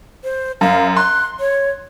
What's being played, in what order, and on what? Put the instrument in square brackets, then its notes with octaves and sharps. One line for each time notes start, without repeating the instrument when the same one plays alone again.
[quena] C5
[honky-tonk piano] F#2 [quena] F5
[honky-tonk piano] C6 [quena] F#6
[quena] C#5